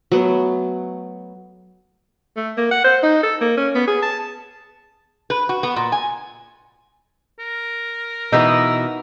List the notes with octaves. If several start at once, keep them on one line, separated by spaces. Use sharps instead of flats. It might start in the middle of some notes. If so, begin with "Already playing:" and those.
F#3 A3 B3
A3
A#3
F#5
C5
D#4
A4
A#3
C#4
B3
G#4
A5
B4
F#4
B3
A#2
G#5
A#4
B2 E3 B3 D#4 E6